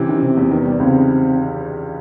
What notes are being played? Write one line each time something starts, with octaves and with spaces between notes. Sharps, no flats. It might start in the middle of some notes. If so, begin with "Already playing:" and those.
Already playing: C3 E3 C#4
D#3
C3 C4
E2
D#3 B3
G3
C#2 C4